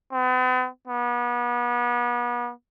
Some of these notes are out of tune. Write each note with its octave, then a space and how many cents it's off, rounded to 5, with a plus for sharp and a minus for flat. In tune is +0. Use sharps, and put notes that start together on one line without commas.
B3 +45
B3 -35